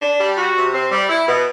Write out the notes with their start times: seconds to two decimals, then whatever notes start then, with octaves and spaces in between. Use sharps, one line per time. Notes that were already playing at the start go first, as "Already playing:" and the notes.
0.01 D4
0.19 G3
0.37 F#4
0.56 C3
0.74 C4
0.91 G3
1.09 E4
1.28 B2